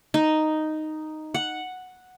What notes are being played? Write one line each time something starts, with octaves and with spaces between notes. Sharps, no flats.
D#4
F#5